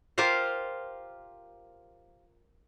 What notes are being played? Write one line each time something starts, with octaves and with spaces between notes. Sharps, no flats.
F4 G4 A#4 C5 F5